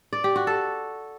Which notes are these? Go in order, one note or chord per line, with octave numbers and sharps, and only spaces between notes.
D5
G4
F#4
A4